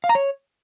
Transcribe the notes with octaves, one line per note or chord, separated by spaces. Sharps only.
F5
A#5
C#5